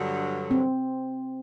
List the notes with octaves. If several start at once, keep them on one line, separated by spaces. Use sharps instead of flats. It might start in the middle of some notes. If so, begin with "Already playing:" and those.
Already playing: G2 D3 F#3
C4